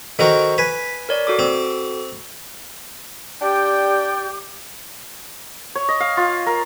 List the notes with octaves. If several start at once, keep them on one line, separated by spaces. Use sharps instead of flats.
D#3 F#4 A4 A#4 C5 C#6
B4 G#5 B6
A#4 C#5 D5
F#4 A4 D6
C4
D4 G4 D5 G5 D6
C#5
D#5
F5
F4
A#4